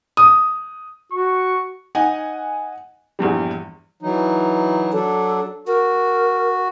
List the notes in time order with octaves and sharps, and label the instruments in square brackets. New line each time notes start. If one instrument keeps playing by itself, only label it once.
[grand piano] D#6
[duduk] F#4 [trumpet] C#6
[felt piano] D#4 F#5 G#5
A#1 E2 G2 G3
[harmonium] E3 F#3 D#4
[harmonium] F#3 D4 [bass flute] A4
[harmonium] F#4 [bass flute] A#4